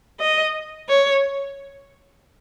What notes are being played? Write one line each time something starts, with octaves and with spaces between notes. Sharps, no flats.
D#5
C#5